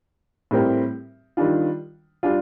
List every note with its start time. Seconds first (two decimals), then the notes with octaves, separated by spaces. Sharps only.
0.51 A2 G3 C4 G4 A#4
1.37 D#3 G3 D4 F4
2.23 G3 D4 F4